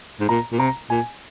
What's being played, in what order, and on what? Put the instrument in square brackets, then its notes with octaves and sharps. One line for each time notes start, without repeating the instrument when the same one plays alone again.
[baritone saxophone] G#2
[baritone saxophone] A#2 [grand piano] A#5
[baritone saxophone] A#2
[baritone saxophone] C3 [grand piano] A#5
[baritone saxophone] A#2 [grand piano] G#5